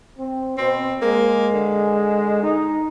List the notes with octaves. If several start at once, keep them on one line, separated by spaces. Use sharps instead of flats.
C4
B2 C4 C5
G#3 A#3
D3
D#4